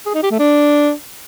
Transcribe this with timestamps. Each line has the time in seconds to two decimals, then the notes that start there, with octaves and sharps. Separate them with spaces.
0.06 G#4
0.14 D#4
0.23 G4
0.31 A3
0.39 D4